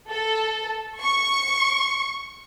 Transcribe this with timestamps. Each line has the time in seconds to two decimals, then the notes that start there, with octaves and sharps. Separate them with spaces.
0.10 A4
1.01 C#6